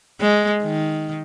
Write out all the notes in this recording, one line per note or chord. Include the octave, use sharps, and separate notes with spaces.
G#3
D#3